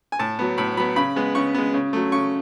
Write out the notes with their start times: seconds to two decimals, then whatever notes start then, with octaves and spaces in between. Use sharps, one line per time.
0.12 G#5
0.19 A2 A5
0.39 F#3 B3
0.58 A2 B5
0.77 F#3 B3 B5
0.96 C#3 B5
1.16 G#3 B3
1.35 C#3 C#6
1.54 G#3 B3
1.74 C#3
1.93 F#3 A3
2.12 C#3 C#6